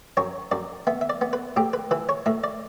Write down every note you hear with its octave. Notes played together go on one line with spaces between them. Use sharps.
F#2 C#5
F#2 D5
B3 E5
E5
D5
B3
B4
A2 G4
B4
E3 B4
C#5
A2 E5
D5